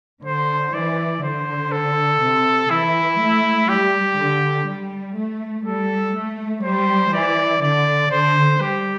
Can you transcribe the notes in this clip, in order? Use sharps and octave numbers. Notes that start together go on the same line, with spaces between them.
D3 C5
E3 D5
D3 C5
A4
C3
E3 E4
A3
G3 G4
D3
G3
A3
G3 A4
A3
G3 C5
E3 D5
D3 D5
D3 C5
G3 G4